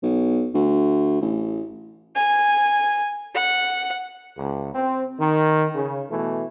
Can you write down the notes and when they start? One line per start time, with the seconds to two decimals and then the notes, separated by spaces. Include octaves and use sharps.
0.03 B1
0.54 D2
1.21 A1
2.16 G#5
3.34 F#5
4.38 C#2
4.75 C4
5.19 D#3
5.75 C#3
6.10 B2 E3 A3